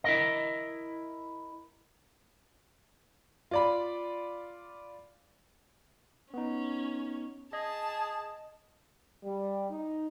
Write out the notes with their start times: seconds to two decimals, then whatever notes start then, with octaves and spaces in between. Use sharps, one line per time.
0.04 E4 A#4 D#5
3.51 F4 D5 B5
6.34 B3 C#4 D#4
7.53 G#4 D#5 A5
9.24 G3
9.70 D#4